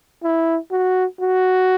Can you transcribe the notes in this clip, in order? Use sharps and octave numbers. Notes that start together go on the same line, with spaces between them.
E4
F#4
F#4